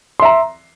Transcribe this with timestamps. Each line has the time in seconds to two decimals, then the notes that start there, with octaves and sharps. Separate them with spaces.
0.20 C6
0.22 E5
0.25 A#5